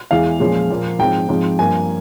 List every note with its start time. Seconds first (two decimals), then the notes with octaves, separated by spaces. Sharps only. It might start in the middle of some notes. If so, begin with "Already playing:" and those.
0.11 E2 E3 G#3 F5
0.40 A#2 F3 G#3 C#4
0.70 A#2 F3 A#3
0.99 G#2 F3 C4 G5
1.29 G#2 F3 C4
1.59 G2 F3 A#3 G#5